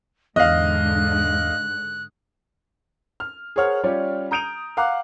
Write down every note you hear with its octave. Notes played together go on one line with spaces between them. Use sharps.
E2 G#2 D3 D#5 F5 F#6
F6
G#4 A#4 C5 C#5 F#5 F6
G3 C#4 F4 G4 C#5 D5
A#5 D#6 G6 D7 D#7 F7
F5 F#5 A#5 D6 F#6